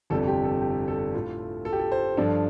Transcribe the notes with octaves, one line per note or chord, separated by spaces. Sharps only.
G1 F2 C3 G3 A4
G4
A4
G4
A4
A2 A3 F4
A4
G4
A4
C5
G2 F3 D4 F4 A4